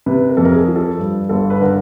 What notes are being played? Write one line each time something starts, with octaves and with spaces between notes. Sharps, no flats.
C3 B4
A#4
F2 A4
A#4
G#4
F3
A4
G2
G1 A4
B4
D3 A#4